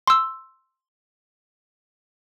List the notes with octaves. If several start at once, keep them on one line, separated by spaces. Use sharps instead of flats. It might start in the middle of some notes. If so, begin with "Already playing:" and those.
C6 E6